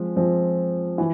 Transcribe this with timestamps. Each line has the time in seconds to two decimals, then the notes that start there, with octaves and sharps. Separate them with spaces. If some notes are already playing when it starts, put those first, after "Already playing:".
Already playing: F3 G#3 C4 F4
0.16 F3 G#3 C4 F4
0.98 E3